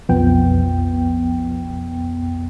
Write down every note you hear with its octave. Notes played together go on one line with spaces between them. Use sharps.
B1 F2 F3 B3 G5